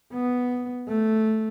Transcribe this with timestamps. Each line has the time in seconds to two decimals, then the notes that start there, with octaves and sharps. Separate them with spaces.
0.13 B3
0.88 A3